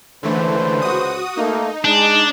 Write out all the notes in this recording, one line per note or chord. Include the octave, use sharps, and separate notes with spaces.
C#2 D3 E3 A3 B4 C5
F#4 D#6
A3 A#3 D#4
G#3 D4